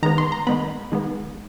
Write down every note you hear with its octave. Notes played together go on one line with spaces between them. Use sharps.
D#3 G#3 B3 A#5
C6
A#5
D#3 G#3 B3 B5
D#3 G#3 B3